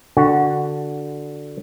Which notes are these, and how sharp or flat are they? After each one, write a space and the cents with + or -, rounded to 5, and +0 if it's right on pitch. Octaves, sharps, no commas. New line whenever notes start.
D3 +0 F#4 +0